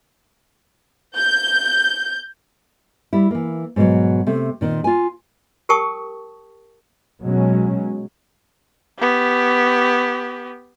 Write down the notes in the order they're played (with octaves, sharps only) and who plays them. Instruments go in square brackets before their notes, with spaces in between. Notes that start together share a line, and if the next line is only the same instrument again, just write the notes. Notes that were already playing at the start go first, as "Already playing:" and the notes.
[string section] G6
[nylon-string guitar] G3 E4
E3 A#3
G#2 B2 F3 F#3
C3 A3
A#2 D#3 C4
F4 G#5
[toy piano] G4 A#4 G5 A5 C#6 D#6
[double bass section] B2 F#3 G#3 C#4
[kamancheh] B3 G4